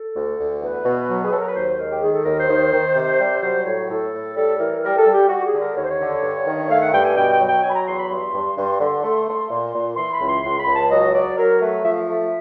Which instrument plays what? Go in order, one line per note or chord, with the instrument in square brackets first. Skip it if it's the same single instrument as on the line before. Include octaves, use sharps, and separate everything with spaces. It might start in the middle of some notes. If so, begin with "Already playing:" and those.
Already playing: [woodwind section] A4
D2
D2
E2 B4
B2
F#3
G#4
F#3 A4
A#4
B4
D#2 C5
G#3 A#4
G4
D#3 G#4
A4
D#2 A#4
C5
D#3
D#3
C3
G3
F#3 C5
A2 C#5
A2 A4
A2
G3 A4
E3 A#4
G3 A#4
A4
G3
G4
G3 F#4
G#4
D3
A#4
D#2 C#5
C5
C#5
D3
G2
D#3
A3 F5
F#5
G2 G5
G#5
B2 G5
G5
F#3
G5
F#3 G#5
B5
A#5
E2 C6
B5
G2 C6
G2
G2
D3
A3
A3
A#2
A#2
E3 C6
B5
C#2
C6
C#2 C6
B5
C#2
A5
F#3 D#5
F#3 D5
F#3 A#4
A3 B4
F3 E5
F5
A3 E5